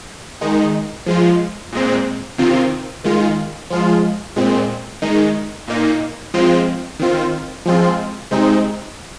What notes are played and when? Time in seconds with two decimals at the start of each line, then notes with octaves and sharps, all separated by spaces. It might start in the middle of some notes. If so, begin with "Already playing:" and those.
0.41 D#3 G#3 D#4
1.06 F3 G#3 F4
1.72 A#2 G#3 C4
2.38 C3 D#3 C4 F4
3.04 D#3 G#3 F4
3.70 F3 G#3 F4
4.36 A#2 G#3 C4
5.02 D#3 G#3 D#4
5.68 A#2 A#3 D#4
6.34 F3 G#3 C4 F4
6.99 D#3 C4 F4
7.66 F3 G#3 C4 F4
8.31 C3 G#3 C4 D#4